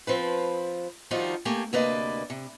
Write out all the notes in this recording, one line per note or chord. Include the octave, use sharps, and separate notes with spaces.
F3 C4 B4
D#3 F3 G3 D#4 F4 F#4
A3 A#3 G4 G#5
D2 C3 A#3 B4 D5 D#5
C3